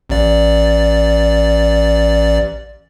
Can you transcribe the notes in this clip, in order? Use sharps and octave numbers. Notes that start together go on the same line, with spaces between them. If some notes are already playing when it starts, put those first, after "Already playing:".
A1 D5